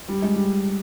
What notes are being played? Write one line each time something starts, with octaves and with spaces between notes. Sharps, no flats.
G3
G#3
G3